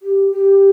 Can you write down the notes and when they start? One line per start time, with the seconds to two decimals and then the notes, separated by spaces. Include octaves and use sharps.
0.02 G4
0.32 G4